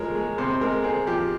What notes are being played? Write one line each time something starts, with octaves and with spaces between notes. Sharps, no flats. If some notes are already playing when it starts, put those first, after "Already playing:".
Already playing: F3 G#3 A#4 C#5
G#3
C3 C5
C5
G#3 A#4
C4 G#4
F3 G4